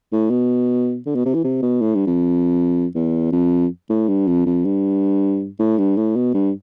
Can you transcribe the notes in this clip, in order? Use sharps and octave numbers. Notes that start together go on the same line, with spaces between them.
A2
B2
D3
B2
C3
E3
C3
B2
A2
G2
F2
E2
F2
A2
G2
F2
F2
G2
A2
G2
A2
B2
G2